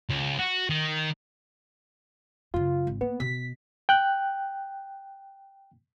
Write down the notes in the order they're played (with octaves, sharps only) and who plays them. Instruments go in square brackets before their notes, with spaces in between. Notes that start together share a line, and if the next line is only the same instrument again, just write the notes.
[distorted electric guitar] C#2
F#4
D#3
[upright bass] F#2 C#3 [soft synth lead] F4
[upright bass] G#1
[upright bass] A#3 [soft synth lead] B3
[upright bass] B2 [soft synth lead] B6
[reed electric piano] G5 F#6